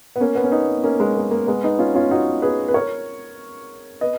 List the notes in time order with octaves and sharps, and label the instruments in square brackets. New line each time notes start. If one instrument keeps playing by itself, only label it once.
[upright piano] B3
A#3 C#4
B3
C#4
B3 D#4
A#3 C#4
G#3 B3
A#3
A#3
G#3 B3
B3 D#4
C#4 F4
C#4 F4
D#4 F#4
G#4 B4
B4
A#4 C#5
B4 D#5